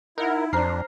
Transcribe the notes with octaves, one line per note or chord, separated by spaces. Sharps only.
D#4 E4 A#4 F#5
F2 D4 C5 A#5 F6 C7